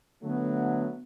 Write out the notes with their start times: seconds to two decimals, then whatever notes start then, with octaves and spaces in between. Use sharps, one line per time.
0.23 D3 F#3 A3 B3